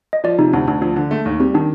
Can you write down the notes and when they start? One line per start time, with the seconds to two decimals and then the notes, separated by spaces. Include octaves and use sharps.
0.13 D#5
0.24 F3 D5
0.38 C3 D#4
0.53 D2 D4
0.67 D2 D4
0.82 F3 D4
0.96 D3 D4
1.11 A3
1.25 D#2
1.40 G3 C4
1.54 D#3 D4